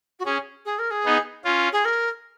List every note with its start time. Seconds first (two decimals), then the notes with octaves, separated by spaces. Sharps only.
0.19 F#4
0.25 C#4 G#4
0.65 G#4
0.79 A#4
0.90 G#4
1.05 B3 D#4
1.45 C#4 F4
1.72 G#4
1.85 A#4